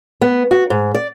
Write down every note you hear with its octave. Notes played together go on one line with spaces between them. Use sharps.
B3
F#4
G#2
D5